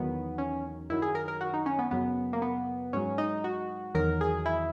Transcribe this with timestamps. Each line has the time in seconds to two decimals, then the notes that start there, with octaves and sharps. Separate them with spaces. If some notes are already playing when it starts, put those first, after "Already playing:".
Already playing: E2 D#3 F#3 B3
0.38 C#4
0.89 F#2 D#3 F#3 E4
1.02 G#4
1.15 A#4
1.28 A#4
1.41 F#4
1.54 D#4
1.66 C#4
1.79 B3
1.91 F#2 C#3 F#3 B3
2.33 A#3
2.42 B3
2.93 G#2 F#3 C#4
3.18 D#4
3.44 F#4
3.94 E2 D#3 F#3 A#4
4.21 G#4
4.46 E4